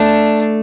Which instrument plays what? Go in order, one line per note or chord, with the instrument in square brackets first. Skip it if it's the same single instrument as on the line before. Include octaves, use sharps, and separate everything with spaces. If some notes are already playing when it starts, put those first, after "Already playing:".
Already playing: [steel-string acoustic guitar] A3 [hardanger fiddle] D4